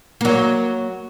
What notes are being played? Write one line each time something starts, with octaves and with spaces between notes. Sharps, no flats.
F#3 A#3